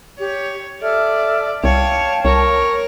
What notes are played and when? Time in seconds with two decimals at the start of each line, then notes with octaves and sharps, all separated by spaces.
0.19 G4 C#5
0.82 A4 D5 E5 F6
1.64 C2 C#5 F5 G5 A5
2.25 C2 A#4 C#5